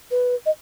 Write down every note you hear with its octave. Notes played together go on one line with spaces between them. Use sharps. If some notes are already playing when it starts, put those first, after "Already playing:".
B4
D#5